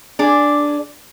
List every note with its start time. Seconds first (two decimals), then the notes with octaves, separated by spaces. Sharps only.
0.19 D4 G#4